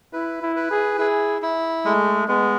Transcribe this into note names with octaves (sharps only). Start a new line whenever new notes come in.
E4 B4
E4
B4
G#4
E4 G#4
E4
G#3 A3
G#3 B3